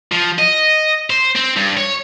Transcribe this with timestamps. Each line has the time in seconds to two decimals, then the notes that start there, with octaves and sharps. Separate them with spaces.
0.12 F3
0.39 D#5
1.10 C5
1.35 C4
1.56 G2
1.77 C#5